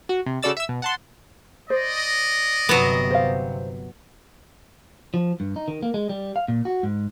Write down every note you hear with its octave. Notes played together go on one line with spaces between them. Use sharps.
F#4
C3
C#3 F#4 A4 D5 E6 A6
E5 E6
B2
F#5 A5 C6
C5 D5 D#5
G1 C3 F#3 B3
C5 F5
F3
G2
D#4
D#3
A#3
G#3
G3
F5
A#2
F#4
G#2